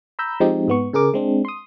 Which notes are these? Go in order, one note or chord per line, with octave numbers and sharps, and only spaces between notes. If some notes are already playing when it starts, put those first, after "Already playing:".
A#5 B5 E6 G6
F3 G#3 C4 D#4 G4
G#2 B3 C#6
C#3 G#4 A#4 D6
G#3 C4 D4
C6 D#6